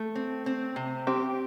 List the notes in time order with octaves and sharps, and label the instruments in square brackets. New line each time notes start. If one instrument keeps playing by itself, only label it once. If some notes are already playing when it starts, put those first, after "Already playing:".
Already playing: [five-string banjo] A3
[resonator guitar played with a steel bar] C4
C4
C3
[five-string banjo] C4 [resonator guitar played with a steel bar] G4